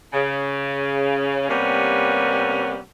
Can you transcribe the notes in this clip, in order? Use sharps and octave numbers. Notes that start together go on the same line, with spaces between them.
C#3
C3 G3 A#3 B3 C#4